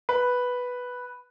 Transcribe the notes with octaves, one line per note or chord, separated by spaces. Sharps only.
B4